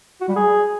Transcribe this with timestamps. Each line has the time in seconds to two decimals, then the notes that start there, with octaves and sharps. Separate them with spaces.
0.21 F#4
0.28 G3
0.36 G#4